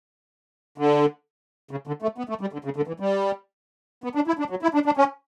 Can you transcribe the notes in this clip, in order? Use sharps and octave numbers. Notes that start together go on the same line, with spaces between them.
D3
C#3
D3
A3
B3
A3
G3
D3
C#3
D3
E3
G3
B3
D4
E4
D4
F#3
E4
D4
D4
C#4